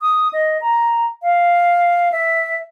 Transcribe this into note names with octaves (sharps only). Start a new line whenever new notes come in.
D#6
D#5
A#5
F5
E5